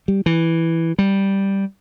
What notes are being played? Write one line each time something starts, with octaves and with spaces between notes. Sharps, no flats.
G3
E3
G3